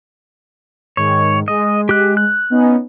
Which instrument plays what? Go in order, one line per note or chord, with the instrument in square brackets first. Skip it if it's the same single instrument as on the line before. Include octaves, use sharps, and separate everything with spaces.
[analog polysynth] G#2 D#3 [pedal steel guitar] C#5
[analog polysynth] G#3 [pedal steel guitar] D#5
[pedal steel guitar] G4 F#6
F#6
[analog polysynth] B3 C#4 D#4